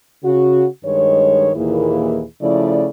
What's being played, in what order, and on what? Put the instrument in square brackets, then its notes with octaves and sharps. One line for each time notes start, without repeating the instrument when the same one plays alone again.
[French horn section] C#3 F#4
G2 D#3 G#3 C#5
D#2 A#2 E3 A#3 E4 G#4
C#3 F3 A3 E4 D5